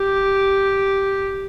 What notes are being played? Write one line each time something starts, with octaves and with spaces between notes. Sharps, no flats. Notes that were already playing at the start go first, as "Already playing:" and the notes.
Already playing: G4